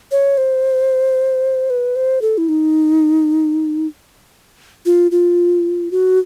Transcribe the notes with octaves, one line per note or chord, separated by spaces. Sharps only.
C#5
C5
B4
C5
A4
E4
D#4
F4
F4
F#4